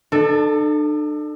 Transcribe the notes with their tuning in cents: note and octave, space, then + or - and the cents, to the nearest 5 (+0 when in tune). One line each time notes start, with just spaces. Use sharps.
D4 +40 A4 +0